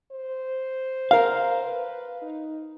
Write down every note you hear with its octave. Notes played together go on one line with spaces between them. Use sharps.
C5
A#4 F5
B4
D#4